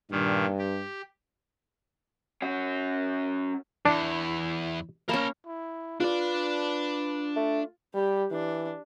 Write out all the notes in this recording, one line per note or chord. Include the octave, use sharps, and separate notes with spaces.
G2 A#2 D#3
G4
C#4 F#4
E2 D4 E4
A#3 C#4 A#4 A5 B5
E4
D4 F4 B4 D5
A3
G3 G4
E3 D4